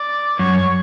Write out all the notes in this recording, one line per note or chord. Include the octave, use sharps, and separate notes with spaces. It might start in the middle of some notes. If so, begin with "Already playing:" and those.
Already playing: D5
F#2 C#5